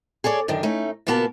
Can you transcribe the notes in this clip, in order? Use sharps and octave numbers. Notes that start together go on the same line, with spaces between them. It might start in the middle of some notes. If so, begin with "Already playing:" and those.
G#4 A4 C#5 D5
F#2 D3 D#3 D4
A3 C#4 D#4
A#2 C#3 A#3 B3 F#4 A5